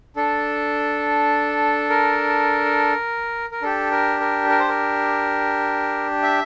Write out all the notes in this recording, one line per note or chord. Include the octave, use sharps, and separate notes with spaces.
D4 A4
A#4
A#4
D4 G4 A4
A#4
A#4
A#4
C5
A#4
E5